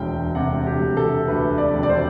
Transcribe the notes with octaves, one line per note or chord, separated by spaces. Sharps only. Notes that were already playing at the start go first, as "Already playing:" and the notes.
Already playing: E1 D2 G5
C3 F#5
G4
E1
A4
D2 B4
D5
E1
D5
C5